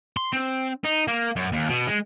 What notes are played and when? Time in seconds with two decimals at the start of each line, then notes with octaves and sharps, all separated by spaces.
0.17 C6
0.33 C4
0.85 D#4
1.08 A#3
1.36 F#2
1.52 D#2
1.69 B2
1.88 G#3